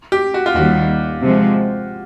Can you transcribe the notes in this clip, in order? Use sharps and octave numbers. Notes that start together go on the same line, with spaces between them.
G4
F#4
F4
D#2 D#3 G3 F#4
C3 F3 G#3